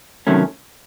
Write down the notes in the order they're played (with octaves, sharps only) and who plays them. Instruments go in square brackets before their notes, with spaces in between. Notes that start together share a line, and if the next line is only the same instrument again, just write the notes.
[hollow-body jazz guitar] C3 D#3 F#3 A3 C#4